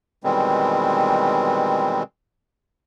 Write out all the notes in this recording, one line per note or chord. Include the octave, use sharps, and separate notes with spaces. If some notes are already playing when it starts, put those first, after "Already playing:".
B2 D#3 E3 G3 G#3 C4